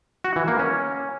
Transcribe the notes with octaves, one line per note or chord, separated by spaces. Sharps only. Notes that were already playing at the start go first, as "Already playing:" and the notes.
F#4
E3
A#3
C#4